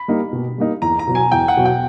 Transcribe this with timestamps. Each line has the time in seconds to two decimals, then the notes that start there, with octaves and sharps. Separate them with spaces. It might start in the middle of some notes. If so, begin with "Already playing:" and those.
Already playing: B5
0.08 G3 A#3 D#4
0.33 B2
0.58 G3 A#3 D#4
0.82 E2 A#5
0.99 A#5
1.07 B2 F#3
1.15 G#5
1.32 E2 G5
1.48 F#5
1.57 B2 F#3
1.65 G5